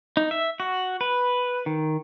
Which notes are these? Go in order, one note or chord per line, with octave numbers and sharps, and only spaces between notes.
D#4
E5
F#4
B4
D#3